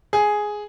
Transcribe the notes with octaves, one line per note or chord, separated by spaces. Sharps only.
G#4